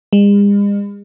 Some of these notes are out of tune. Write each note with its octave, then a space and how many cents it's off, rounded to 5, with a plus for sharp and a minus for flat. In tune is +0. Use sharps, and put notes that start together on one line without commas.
G#3 -45